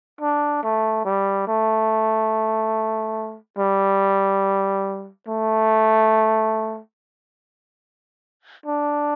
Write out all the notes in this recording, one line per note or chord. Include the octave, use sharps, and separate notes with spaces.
D4
A3
G3
A3
G3
A3
D4